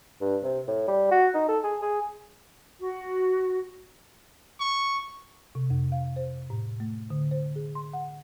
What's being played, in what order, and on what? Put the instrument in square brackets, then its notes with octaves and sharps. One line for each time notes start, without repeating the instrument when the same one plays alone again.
[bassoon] G2
C3
A2
G3
F#4
D#4
A4
G#4
G#4
[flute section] F#4
[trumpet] C#6
[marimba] C3
F2
F5
C5
A2
A3
D3
C5
G#4
C6
F#5